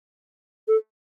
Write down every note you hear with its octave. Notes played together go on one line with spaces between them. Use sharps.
A4